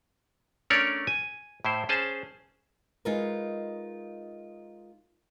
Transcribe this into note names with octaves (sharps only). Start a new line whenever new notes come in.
A3 C#4 D4 A#4 C#5 D5
G#5
A2 E4 C5
C#4 G#4 C5 A5
G#3 D#4 F4 A#4 B4